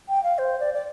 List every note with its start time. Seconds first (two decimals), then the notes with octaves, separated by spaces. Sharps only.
0.09 G5
0.23 F5
0.38 C5
0.60 D5
0.74 D5